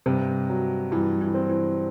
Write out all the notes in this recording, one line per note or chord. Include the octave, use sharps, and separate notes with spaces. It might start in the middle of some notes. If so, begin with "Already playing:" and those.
G2 C3
F#3
G2 E3
E3
C4
E3